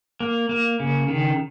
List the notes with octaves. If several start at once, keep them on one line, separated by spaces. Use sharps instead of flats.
A#3
A#3
C#3
D#3